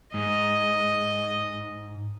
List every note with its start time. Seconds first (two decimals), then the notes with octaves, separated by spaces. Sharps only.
0.14 G#2 D#5